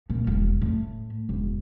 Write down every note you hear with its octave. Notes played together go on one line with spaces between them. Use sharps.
A#2
E1
A2
E1